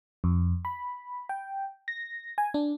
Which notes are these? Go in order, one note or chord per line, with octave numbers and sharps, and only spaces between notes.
F2
B5
G5
A#6
G#5
D4